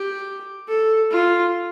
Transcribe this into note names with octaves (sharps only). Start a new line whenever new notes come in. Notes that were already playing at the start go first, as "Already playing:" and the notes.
Already playing: G4
A4
F4